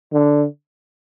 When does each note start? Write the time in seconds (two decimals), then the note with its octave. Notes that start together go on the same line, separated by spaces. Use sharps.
0.13 D3